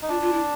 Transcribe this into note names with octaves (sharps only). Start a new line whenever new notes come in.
D#4
D4 F4
F4
E4